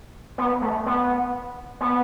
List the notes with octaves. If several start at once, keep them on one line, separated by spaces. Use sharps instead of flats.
B3
A3
B3
B3